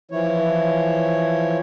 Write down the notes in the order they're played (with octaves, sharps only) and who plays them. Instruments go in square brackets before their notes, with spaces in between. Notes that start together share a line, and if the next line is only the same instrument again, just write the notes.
[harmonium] E3 F3 E4 C#5